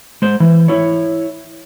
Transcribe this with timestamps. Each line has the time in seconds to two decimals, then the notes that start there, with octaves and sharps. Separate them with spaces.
0.22 G#3 C5
0.40 E3
0.68 E4 C#5